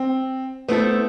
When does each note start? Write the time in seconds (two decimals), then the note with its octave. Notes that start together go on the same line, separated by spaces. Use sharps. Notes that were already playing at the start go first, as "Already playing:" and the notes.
Already playing: C4
0.68 A3 B3 C4 E4 A4